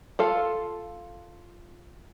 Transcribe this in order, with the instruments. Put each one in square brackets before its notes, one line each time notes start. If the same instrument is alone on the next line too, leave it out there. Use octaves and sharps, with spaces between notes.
[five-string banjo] F4 A4 F5